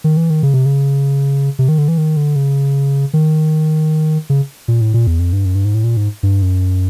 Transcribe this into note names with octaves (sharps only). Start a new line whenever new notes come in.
D#3
E3
D#3
C#3
C3
C#3
C3
D#3
D3
E3
D#3
D3
C#3
D#3
C#3
A#2
A2
A#2
E2
F2
G2
F#2
G2
G#2
A2
A#2
G#2
G2
F#2